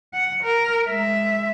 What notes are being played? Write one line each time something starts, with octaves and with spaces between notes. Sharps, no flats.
F#5
A#4
G#3 E5